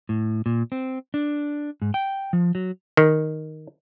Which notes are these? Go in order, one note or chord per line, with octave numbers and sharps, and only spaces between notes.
A2
A#2
C4
D4
G#2
G5
F3
F#3
D#3